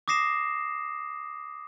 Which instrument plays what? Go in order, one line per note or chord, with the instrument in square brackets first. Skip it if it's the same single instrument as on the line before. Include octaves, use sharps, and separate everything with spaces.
[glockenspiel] D6 D#6 A#6 C7 E7